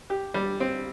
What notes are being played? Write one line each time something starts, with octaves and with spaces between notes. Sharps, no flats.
G4
G3
C4